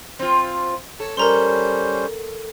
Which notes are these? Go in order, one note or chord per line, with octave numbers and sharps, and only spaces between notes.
C4 F4
A4 C#5
G3 C#4 A#4 C5 A#5 C6